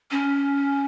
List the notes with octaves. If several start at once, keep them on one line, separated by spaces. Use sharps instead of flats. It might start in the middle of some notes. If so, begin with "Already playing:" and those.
C#4